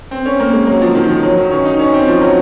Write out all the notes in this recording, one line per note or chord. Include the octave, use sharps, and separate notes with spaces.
C4
C#4
A#3
G#3
F#3
F3
D#3
F3
F#3
D#3
C#4
D#4
C#4
C4
F3
F#3